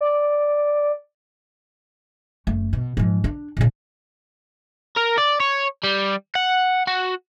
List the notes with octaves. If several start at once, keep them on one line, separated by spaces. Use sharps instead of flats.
D5
F#1 A3
B2
G#2 F3
D4
A#2 C#3
A#4
D5
C#5
G3
F#5
F#4